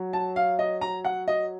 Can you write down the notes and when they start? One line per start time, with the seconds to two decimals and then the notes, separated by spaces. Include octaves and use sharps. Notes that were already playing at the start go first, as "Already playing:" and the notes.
Already playing: F#3
0.13 A5
0.36 F5
0.59 D#5
0.81 A#5
1.05 F#5
1.28 D#5